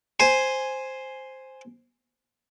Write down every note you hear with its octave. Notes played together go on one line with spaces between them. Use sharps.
C5 G#5